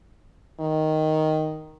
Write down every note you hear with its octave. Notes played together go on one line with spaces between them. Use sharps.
D#3